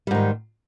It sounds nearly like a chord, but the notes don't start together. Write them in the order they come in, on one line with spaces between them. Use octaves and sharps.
G3 G#2 D#3